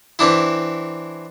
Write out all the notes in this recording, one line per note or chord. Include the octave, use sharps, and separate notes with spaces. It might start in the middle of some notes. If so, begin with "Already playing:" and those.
E3 C4 D4 E4